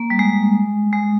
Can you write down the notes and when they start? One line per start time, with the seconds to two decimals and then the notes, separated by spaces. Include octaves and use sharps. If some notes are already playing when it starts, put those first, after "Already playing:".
Already playing: A#3
0.10 G3
0.19 G#3
0.93 G#3